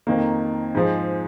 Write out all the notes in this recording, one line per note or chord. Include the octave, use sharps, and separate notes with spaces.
F2 D#3 A#3
G#2 F3 G#3